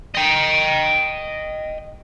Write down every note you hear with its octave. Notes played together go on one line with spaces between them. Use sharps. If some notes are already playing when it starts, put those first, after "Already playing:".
D#5 G5